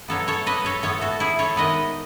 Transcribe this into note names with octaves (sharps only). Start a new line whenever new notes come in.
B2 F#3 B3 A4 C#5
A4 C#5
B4 D#5
A4 C#5
A2 G#3 B3 A4 C#5
F#4 A4
E4 G#4
A4 C#5
D#3 G#3 B3 B4 D#5